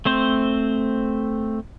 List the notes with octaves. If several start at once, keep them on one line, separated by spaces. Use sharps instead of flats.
A3 C4 C5